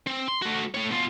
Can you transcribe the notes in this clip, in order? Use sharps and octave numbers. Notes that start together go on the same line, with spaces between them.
C4
C6
A3 F#4
A3 C#5
B2 F4